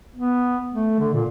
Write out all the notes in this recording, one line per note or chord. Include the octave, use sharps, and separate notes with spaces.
B3
A3
D3
A#2